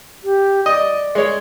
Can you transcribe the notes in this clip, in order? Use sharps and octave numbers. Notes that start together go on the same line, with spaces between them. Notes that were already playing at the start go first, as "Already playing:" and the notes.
G4
D5 D#5
G#3 C#5